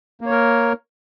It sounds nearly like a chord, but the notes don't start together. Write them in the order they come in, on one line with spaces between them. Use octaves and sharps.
A#3 C#5 A#4